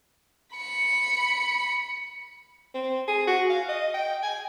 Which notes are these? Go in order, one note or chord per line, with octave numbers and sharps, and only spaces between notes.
B5 C#7
C4
G#4
F#4
F5
D#5
G5
G#5